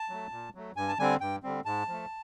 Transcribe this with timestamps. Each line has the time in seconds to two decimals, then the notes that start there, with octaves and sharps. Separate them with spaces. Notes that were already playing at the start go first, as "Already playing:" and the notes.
Already playing: A5
0.09 F#3 A3
0.31 A#2
0.55 F#3 A3
0.76 G2 G#5
0.88 A5
0.99 D3 G3 C4 G#5
1.21 G2 G5
1.43 D3 G3 C4
1.65 G#2 A5
1.88 F3 A3